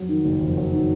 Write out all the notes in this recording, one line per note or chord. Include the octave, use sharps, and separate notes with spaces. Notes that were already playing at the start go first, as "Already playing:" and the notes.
Already playing: F2 F#3
D#3
F#1
F2
F#3
D#3